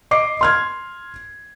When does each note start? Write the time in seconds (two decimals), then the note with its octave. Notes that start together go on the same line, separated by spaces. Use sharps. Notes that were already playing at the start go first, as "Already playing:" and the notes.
0.11 D#5 D6 C7
0.41 C6 F6 G#6